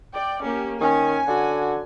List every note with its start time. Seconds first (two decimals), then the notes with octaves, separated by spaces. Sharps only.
0.14 D5 G5
0.43 A#3 C#4 G4
0.81 D#3 C#4 G#5
1.27 D3 F#4